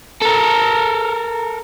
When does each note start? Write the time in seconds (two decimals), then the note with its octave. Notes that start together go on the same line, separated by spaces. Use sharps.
0.22 A4 A#4